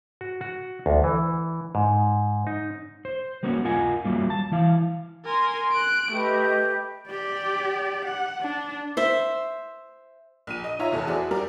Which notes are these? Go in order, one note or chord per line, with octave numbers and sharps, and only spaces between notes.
F#4
F#4
D2
E3
G#2
D#4
C5
G3 A#3 B3 C#4 F#4
F4 A#4 D#5 F#5 G#5
F#3 G3 A#3 F4
A5
E3 E4 F5
A#4 G#5 C6
F#6 D7
A3 G4 B4 D#5
G4 D5
F#5
D4
C5 E5
A#1 D#7
D#5
D#4 F4 C#5 E5 A#5
F1 E2 A4
E4 F#4 G#4 C5 D5
G3 A#4 D5